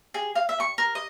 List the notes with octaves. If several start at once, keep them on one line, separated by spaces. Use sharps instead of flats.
G#4
F5
E5
C#6
A#4
D#5